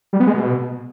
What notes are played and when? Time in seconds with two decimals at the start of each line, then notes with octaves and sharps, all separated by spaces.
0.13 G3
0.20 B3
0.27 G#3
0.34 B2